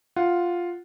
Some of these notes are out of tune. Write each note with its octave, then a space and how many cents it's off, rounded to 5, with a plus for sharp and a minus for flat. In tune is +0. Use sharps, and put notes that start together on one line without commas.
F4 +0 F#5 -5